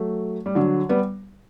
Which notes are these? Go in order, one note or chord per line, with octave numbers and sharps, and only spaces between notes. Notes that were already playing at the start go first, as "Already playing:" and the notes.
Already playing: F#3 A3
G3
D3 F#3
G3 B3